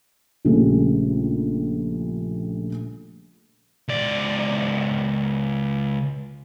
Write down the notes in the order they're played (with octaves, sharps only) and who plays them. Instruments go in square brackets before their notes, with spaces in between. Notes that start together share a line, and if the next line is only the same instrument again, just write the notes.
[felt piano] A#1 C#3 G3 A3
[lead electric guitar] C#2 D5